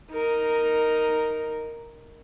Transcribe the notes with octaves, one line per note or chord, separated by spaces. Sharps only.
D#4 A#4